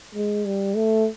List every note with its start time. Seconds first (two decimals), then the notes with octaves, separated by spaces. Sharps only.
0.15 G#3
0.45 G3
0.76 A3